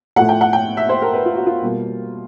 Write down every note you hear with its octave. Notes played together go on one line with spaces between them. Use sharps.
A2 F3 A3 F#5
G5
F#5
G5
E5
C5
A#4
B4
F4
F#4
F4
B2 G3 A#3